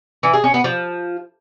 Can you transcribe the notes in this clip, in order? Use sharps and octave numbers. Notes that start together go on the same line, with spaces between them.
E3
G#4
C#4
B3
F3